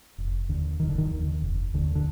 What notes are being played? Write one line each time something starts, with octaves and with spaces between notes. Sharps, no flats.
F1
D#2 D3
F1 D#3
D3
D#3
D#2 D3
F1
D#2 D3
D3